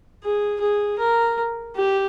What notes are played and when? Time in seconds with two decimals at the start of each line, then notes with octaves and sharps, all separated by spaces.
0.23 G#4
0.61 G#4
0.99 A#4
1.76 G4